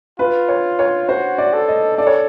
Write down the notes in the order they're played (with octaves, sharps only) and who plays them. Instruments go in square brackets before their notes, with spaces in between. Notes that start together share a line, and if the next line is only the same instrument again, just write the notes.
[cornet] F4 [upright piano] B4
[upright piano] C#5
C#5
[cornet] F#4 [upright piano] C5
[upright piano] D5
[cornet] A4
[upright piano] D#5
[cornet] A4 [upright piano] D5
[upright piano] C#5